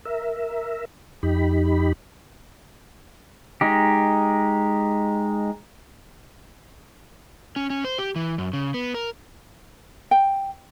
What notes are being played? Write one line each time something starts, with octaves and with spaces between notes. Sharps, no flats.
A#4 E5
F2 D#4 G4 B5
G#3 D#4 G4
C#4
C#4
C5
G4
E3
F#2
C#3
B3
A#4
G5